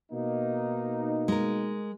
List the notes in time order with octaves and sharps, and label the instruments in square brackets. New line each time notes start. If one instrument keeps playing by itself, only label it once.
[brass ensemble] B2 A#3 D#4
[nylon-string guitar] G#3 A#4